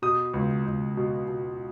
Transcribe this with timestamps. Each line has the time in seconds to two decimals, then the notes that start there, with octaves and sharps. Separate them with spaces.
0.02 B2 D#6
0.34 C#2
0.66 C#2
0.97 B2
1.28 B2